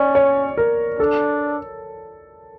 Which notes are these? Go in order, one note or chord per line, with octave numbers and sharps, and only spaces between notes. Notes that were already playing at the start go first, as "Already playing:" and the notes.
Already playing: C#4 D5
C#5
A#4
D4 A4